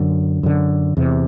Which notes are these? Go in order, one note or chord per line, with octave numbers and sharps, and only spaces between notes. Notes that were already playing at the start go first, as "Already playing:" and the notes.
Already playing: F#2 D3
F#2 D3
E2 C3